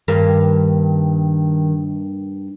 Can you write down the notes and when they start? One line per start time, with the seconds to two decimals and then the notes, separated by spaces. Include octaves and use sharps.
0.08 G2 D#3 A#3